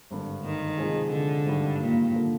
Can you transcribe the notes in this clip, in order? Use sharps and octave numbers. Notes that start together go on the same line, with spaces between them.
G#1 G2 D3
D#3
C3 F3 G#3 D#4 G#4
D3
G#1 G2 D#3 G3
A#2
D3 F3